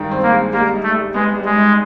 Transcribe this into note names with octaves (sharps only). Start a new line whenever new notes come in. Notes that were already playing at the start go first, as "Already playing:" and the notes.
Already playing: G2 D#3 G#3
C4
A#3
G#3
G3 A#3
D#4
A3
G3
G#3 B3
G3
G#3
D#4